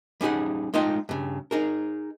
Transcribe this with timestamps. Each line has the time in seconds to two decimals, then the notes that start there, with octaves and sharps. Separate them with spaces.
0.21 G3 C#4 D#4 G#4 F#5
0.74 G#3 A3 D#4 F4 D#5 G5
1.09 G2 C#3
1.51 D#4 G#4 A#4